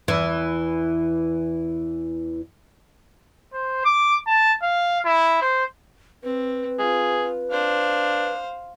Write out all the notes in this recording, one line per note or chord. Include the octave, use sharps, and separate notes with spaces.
E2 E3
C5
D6
A5
F5
E4
C5
C4 B4
F4 G#4
D4 C5 F5